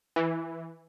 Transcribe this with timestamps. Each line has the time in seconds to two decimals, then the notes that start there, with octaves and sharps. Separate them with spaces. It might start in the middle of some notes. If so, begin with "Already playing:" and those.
0.16 E3